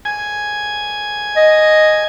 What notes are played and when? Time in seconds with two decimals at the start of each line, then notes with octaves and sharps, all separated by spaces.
0.05 G#5
1.37 D#5